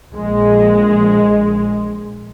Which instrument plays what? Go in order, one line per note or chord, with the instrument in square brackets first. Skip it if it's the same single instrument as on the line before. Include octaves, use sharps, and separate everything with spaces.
[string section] A#1 G#3